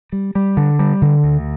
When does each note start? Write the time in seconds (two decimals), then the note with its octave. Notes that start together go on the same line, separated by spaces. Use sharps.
0.12 G3
0.35 G3
0.57 D3
0.79 G3
1.02 D3
1.24 D2